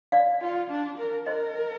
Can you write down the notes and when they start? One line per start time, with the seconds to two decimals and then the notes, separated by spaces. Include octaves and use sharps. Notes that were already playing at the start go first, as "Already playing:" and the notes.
0.12 D5 F5
0.41 F4
0.70 D4
0.98 A#4
1.26 A#4 C5 D#5